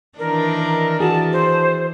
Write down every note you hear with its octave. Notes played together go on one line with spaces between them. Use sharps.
D#3 E3 D4 A#4
A#4
E3 F#4 G#4 A5
C5